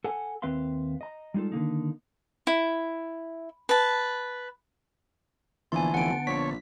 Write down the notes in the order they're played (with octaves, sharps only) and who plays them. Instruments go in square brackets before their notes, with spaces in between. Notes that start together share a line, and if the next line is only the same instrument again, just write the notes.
[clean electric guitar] A4 F#5 G#5
D#2 C4 B4 E5 F5 C6
D#5 A#5
G3 G#3 D#4 F4 A4
D3 D#3 A#3 D#4
[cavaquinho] E4
B4 A5
[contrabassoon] A#1 [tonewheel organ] D3 B3 A5 [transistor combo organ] E3 [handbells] G#5 C6
[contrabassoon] F1 [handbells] F#5 D7
[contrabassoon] A#1 [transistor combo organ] C#5 [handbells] B6